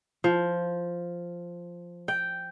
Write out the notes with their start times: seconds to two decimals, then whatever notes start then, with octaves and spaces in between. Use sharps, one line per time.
0.24 F3
2.08 G5